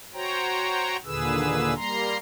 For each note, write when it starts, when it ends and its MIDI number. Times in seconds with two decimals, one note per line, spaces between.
0.13 0.97 66
0.13 0.97 72
0.13 0.97 73
0.13 0.97 79
0.13 0.97 82
1.05 1.74 39
1.05 1.74 46
1.05 1.74 50
1.05 1.74 68
1.05 1.74 71
1.05 1.74 88
1.75 2.17 55
1.75 2.17 58
1.75 2.17 82
1.75 2.17 84